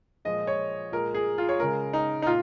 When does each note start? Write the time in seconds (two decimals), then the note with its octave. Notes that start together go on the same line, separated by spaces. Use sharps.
0.25 A#2 F3 G#3 D#5
0.47 C#5
0.92 A#2 G#3 A#4
1.14 G#4
1.38 F4
1.49 C#5
1.60 C#3 G#3 A#4
1.93 D#4
2.22 D#4
2.26 A#2 F4